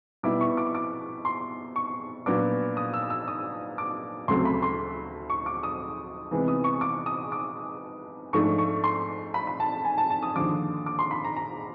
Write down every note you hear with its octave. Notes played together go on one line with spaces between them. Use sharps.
B2 G3 B3 E4 D6
C#6
D6
D6
C6
C#6
A#2 F#3 B3 D4 D6
D#6
E6
E6
D#6
D6
D2 C#3 F#3 A3 C4 C6
B5
C6
C#6
D6
D#6
C3 E3 G#3 B3
D#6
C#6
D6
D#6
D6
G#2 F3 A3 D4 C#6
C#6
C6
B5
B5
A5
G#5
A5
A5
D#6
D#2 D3 F3 D6
D6
C6
B5
A#5
A#5